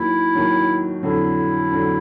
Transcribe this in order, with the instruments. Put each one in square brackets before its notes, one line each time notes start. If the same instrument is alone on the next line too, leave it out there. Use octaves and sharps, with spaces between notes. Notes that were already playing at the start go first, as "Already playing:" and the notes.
Already playing: [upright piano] D#2 D#3 F#3 [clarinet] E4
[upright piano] D#2 D#3 F#3
[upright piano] F2 D3 F#3 [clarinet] E4
[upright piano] F2 D3 F#3